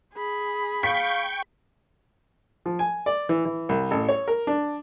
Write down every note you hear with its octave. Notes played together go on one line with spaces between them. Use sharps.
G#4 B5
F5 G5 C#6 B6
F3
G#5
D5
E3
E3
C2
A1
C#5
A#4
D4